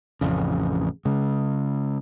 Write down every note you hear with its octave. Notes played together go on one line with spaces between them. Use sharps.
A1 F2 C#3
C#3 G#3